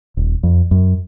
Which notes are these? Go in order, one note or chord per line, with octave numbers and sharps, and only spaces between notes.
D#1
F2
F#2